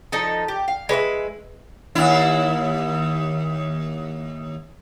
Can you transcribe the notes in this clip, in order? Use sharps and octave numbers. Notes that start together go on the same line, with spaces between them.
F3 D#4 A4
G4
F5
G#3 B4 C#5 E5
D#2 E4